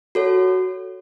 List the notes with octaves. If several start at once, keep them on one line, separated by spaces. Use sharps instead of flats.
F#4 A4 C#5